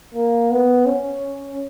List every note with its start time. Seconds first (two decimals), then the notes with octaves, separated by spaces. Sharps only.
0.14 A#3
0.51 B3
0.86 C#4